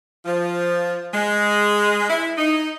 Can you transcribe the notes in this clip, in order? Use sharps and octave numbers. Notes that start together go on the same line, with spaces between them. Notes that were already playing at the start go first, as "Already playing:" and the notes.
F3
G#3
E4
D#4